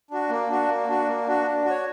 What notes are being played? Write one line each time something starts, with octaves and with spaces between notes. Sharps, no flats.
D4 F#4
A#3
D4 F#4
A#3
D4 F#4
A#3
D4 F#4
D4
F#4
C#5